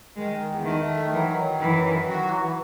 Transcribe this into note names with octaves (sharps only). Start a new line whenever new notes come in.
D#3 G#3
D#3
E2
D#3 A3
A3
D#3
E3 F#3
D#3
F#3
F#2 E3
D#3
F#3
F#4
E3
E3